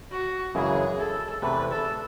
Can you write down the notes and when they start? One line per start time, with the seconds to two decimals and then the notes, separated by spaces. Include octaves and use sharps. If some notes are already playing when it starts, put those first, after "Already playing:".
0.11 F#4
0.54 F#2 C#3 E3 G#3 G#4
0.99 A4
1.42 E2 C3 E3 A3 B4
1.72 A4